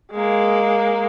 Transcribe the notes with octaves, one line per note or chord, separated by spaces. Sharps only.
G#3 A#3